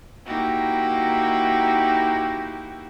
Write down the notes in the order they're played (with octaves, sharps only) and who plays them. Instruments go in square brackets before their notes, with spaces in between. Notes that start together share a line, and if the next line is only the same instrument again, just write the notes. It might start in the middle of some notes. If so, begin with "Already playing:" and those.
[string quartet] A#3 D#4 E4 F#4 G4